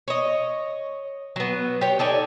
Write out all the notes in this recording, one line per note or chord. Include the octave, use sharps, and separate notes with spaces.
C#5 D#5
F#3 B3
G4 C#5
D#4 A4 D5 G#5